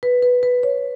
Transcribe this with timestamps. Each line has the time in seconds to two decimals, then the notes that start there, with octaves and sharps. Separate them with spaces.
0.03 B4
0.23 B4
0.43 B4
0.63 C#5